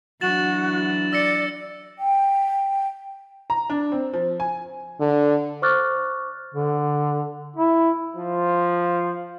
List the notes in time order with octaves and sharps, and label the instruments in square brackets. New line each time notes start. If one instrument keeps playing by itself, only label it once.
[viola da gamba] E3 F#3 D4 [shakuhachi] F#4 [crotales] A6 E7 F#7
[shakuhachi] D5 [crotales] E6 A#6 C#7
[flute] G5
[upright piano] A#5
D4
C4
F3
G#5
[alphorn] D3
[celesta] C5 C#6 D6 F6 F#6 A6
[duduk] D3
E4
[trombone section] F3